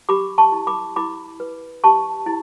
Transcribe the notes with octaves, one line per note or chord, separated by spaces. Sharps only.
G4 B5 D6
A5 C#6
E4
B5 D6
E4 B5 D6
B4
G4 A5 C#6
E4